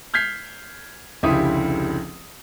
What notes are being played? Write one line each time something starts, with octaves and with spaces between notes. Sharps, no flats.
F6 G6 G#6 B6 C7
F1 C#2 D3 E4 G4 D#6